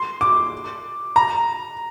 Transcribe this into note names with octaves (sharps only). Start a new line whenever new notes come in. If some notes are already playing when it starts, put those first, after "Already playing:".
Already playing: C6
D6
A#5